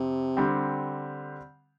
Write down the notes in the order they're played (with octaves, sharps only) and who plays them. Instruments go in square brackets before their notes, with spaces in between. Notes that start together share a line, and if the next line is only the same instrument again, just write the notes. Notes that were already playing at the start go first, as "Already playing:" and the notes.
Already playing: [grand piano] F2 [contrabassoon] C3
[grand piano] D3 G3 C4